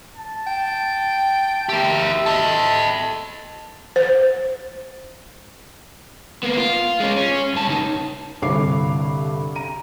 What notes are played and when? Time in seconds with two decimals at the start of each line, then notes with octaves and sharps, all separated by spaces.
0.16 A5
0.47 G5
1.69 G4 A#4 E5
2.26 A4 D#5 A5
3.96 C5
6.43 A#3 B3
6.57 F4
7.00 G#3 C#4
7.17 C#4
7.54 G2 A5
7.67 C#2 D#4
8.42 C2 G2 D3 C#5 D6 C7
9.56 A#5 D#7